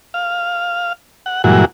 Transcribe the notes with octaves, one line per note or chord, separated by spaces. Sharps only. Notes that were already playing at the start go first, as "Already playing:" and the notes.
F5
F#5
G2 A#2 E3 F#3 G#3 F#4